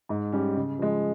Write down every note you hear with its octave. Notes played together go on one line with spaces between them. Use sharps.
G#2
G3 C#4
C#3
F3 G#3